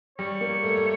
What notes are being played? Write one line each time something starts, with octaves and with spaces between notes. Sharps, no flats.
G3 C#5
A#3
A3
A3